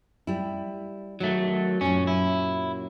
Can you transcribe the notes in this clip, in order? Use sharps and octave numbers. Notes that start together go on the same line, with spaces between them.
G3 E4
D#3 F#3 A3
F#2 A#2 F#3 C#4
E4